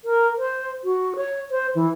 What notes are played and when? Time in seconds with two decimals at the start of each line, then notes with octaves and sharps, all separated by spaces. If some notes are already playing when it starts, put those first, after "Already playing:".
0.05 A#4
0.38 C5
0.84 F#4
1.16 C#5
1.51 C5
1.75 E3